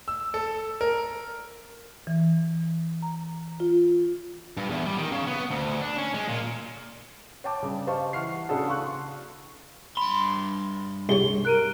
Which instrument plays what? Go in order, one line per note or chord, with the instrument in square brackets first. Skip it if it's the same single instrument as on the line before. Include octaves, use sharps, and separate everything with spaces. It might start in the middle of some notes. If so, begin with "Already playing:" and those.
[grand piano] E6
A4
A#4
[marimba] E3
A#5
F4
[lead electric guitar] G2
E2
G3
D#3
C#3
B3
D2
D4
C#4
G#3
A#2
[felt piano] C#5 G5 A5 D6
G2 C#3
G4 C5 D#5 F5 A5 C#6
E3 F#5 C#6 F6 C7
C#3 D4 F#4 G#4 A4
F5 C6 C#6 F#6
[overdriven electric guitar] G2 C6 [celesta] B5
[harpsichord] C2 C#5 [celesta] G#4 G7
[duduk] A#4 [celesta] F#6 D7 D#7